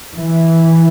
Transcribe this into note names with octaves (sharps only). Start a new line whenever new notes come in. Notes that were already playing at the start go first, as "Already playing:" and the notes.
E3